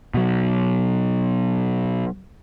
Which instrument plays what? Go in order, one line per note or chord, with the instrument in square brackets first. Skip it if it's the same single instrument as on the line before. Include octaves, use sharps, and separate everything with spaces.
[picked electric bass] B2 F#3